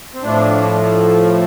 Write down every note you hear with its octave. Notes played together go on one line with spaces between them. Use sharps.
C4
A2 F3 A3 D4